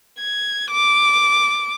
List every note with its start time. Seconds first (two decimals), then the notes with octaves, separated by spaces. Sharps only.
0.19 G#6
0.71 D6